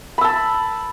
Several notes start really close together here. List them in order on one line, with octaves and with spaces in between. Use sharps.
B5 E6 A5